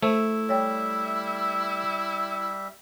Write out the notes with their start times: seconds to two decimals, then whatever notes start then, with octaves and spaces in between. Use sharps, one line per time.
0.03 A3 E4 C5
0.49 G3 C#5 E5 G5